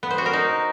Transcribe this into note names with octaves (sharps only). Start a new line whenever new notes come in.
B3
C5
F#4
A#4
D#4